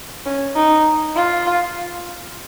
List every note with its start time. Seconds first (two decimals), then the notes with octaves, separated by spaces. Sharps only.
0.26 C#4
0.56 D#4
1.15 F4